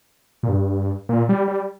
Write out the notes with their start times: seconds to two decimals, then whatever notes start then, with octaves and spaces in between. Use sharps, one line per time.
0.43 A#2
0.49 G2
1.09 A#2
1.29 G3
1.48 G3